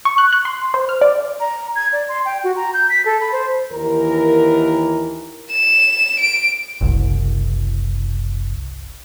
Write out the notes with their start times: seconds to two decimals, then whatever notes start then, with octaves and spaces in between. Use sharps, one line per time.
0.05 C#6
0.18 F#6
0.33 F#6
0.45 C6
0.74 C5
0.89 F6
1.01 D5
1.40 A#5
1.75 G#6
1.93 D5
2.08 C6
2.25 G5
2.44 F#4
2.56 A#5
2.74 G6
2.89 B6
3.05 A4
3.20 B5
3.32 C5
3.72 D#2 E3 A#4
5.52 E7
6.19 D7
6.81 F#1 C2